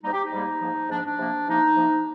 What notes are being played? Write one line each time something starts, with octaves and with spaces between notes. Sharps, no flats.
G#2 G3 A#3 D#4
G4
D#4
G#2 G3 A#3
G#2 F3 A#3
G#2 F3 A#3 D4
D4
C3 F3 A#3
C3 F3 A#3 D#4
C3 F3 A#3